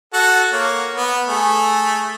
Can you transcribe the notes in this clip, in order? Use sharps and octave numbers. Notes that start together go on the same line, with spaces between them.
F#4 A4 F#5
A#3 C#5
B3
A3 G#4